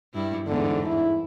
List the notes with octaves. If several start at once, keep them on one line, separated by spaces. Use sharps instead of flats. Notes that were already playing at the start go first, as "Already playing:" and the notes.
G2 E4
E2 G#2 D3
E4